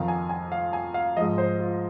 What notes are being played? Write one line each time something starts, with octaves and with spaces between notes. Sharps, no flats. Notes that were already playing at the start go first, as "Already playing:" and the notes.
Already playing: F2 D#3 F5
G#5
G#5
F5
G#5
F5
G#2 F3 D#5
C5
F4